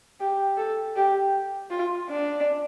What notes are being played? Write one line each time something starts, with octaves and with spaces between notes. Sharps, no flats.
G4
A4
G4
F4
D4